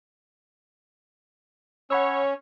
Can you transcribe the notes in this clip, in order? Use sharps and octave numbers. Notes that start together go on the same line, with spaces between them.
C#4 C#5 F#5 B5 E6